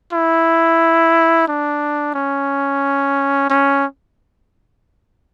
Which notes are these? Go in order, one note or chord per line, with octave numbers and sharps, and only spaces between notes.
E4
D4
C#4
C#4